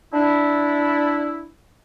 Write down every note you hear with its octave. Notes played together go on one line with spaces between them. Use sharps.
D4 E4